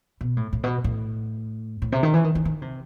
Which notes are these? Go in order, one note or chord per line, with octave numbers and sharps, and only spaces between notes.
B2
A2
A2
B2
A2
A2
C3
D#3
E3
D#3
D#3
D#3
C3